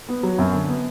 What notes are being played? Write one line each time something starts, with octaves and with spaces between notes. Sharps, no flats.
B3
F#3
F#2
D3
B3